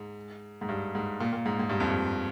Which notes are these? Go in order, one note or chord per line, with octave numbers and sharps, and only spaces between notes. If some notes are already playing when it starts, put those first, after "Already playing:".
Already playing: G#2
G#2
G2
G#2
A#2
A#2
G#2
G#2
G2
F2
G2